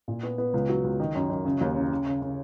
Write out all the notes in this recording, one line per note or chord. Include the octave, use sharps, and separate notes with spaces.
A#2
B3
B3
C#2
F#3
C#2
D#3
F#2
F#2
C#3
D#2
C#3
C#3
C#3
C#3